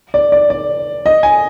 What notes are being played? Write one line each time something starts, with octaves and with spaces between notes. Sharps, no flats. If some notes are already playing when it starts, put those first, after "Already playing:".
D5
D5
D5
D#5
G#5